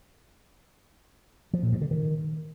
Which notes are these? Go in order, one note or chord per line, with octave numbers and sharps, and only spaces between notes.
F3
A#2
G2
D3
D#3